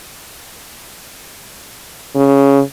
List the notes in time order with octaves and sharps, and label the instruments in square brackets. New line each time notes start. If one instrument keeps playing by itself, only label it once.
[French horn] C#3